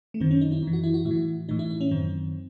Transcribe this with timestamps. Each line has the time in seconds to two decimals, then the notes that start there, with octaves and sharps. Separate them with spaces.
0.14 A3
0.20 F#2 D#3 C4
0.31 C#4
0.41 D#4
0.52 E4
0.62 F#2
0.67 E3
0.73 F#4
0.84 E4
0.94 F#4
1.05 A2 E4
1.11 E3
1.49 A2 E3 D#4
1.59 E4
1.70 E4
1.81 C#4
1.91 F#2 D#3 C4